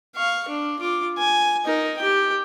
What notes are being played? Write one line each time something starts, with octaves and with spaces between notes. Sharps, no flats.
F5 C#6
D4
F4 D6
G#5
D#4 A#4
G4 G5